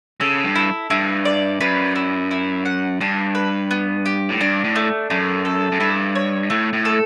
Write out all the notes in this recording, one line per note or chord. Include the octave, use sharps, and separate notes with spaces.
C#3 A4
G2
E4
G2 E4
D5
F#2 B4
E4
E4
F#5
G2 D4
B4
B3
G4
A2
G2 D4
A2
A3
F#2 A3
A4
F#2
G2 E4
C#5
A2 A3
A2
A4